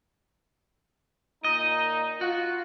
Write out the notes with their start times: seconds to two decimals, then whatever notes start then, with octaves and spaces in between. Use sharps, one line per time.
1.44 A#2 D#4 D#5
2.21 F4 F#4